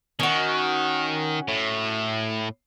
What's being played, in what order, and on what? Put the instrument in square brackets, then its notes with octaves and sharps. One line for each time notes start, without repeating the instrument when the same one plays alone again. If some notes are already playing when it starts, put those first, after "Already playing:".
[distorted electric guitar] D#3 [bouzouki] C#4 F#4
[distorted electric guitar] A2